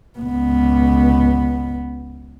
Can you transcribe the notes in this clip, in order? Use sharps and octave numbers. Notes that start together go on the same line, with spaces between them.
C#2 B3